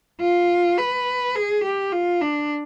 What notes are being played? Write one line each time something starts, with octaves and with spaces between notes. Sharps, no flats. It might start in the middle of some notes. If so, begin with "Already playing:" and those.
F4
B4
G#4
G4
F4
D4